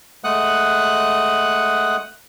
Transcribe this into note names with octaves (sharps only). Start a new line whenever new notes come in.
G#3 A3 F#5 D#6 F#6